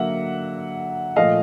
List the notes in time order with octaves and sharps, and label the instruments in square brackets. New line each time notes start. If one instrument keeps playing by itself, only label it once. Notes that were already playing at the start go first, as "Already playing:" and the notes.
Already playing: [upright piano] D3 F#3 A#3 E5 F#5
A#2 F3 A3 D#5 F5